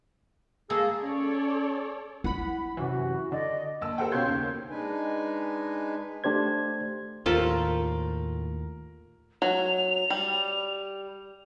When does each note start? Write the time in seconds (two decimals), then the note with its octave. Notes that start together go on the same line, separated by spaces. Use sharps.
0.70 G#3 A#3 G#4 A4
1.02 C#4 A4 C#5 D5
2.24 E4 F#5 B5
2.77 F#2 C3 E3 F#4
3.32 D3 D5 D#5
3.81 A#1 G#5 A5 E6
3.98 G4 A4 A#4 C5 F#5 G5
4.12 B2 C#4 F5 C6 G6 G#6
4.27 D#2 C#3
4.70 G#3 D4 D#4 B4 G#5
6.24 A3 D4 G4 C5 G#6
7.26 D#2 A2 F4 G4 A4 A#4 C5 C6
9.42 F#3 F7
10.10 G3